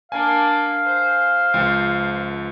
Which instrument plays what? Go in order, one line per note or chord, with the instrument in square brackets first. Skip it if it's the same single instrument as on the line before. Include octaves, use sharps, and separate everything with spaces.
[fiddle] A#3 D4 [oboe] F5 [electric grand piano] G#5
[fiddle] C5
[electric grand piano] C#2 F3